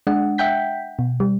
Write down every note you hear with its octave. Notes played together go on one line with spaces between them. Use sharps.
G#3 D4 F#5
E5 F#5 G5 G6 B6
B2
G3